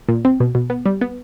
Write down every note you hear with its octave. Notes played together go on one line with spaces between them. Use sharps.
A#2
C4
B2
B2
B3
G3
B3